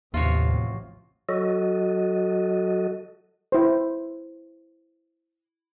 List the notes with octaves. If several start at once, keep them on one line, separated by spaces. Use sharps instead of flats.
A1 D#2 C3 F3 F4 F#4 C#5
F#3 F#4 A4 D#5
E4 C5